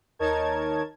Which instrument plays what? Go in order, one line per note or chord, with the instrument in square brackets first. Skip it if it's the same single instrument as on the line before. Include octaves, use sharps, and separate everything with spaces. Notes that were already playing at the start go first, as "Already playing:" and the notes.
[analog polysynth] D#2 D#4 A#4 C#5 A5 G#6